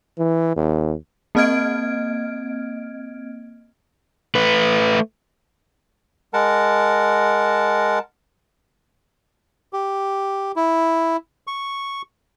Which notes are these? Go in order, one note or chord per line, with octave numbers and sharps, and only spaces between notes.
E3
D#2
A#3 C4 D#5 F6 G#6 D7
A3 B4
G#3 A#4 F#5 A5
G4
E4
C#6